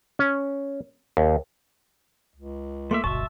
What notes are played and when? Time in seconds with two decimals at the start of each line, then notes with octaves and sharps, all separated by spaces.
0.19 C#4
1.17 D#2
2.36 C#2
2.91 A3 A#3 E5 C6
3.04 D1 G1 B2 E5 A5 C#6